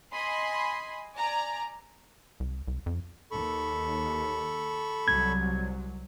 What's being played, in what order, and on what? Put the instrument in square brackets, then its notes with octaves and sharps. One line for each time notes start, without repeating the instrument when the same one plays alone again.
[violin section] D#5 G#5 B5 C6
D5 G#5 A#5
[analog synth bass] C2
C2
F2
[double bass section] D#2 [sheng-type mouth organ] A4 B5 C#6
[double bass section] C2 F#3 [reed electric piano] G#6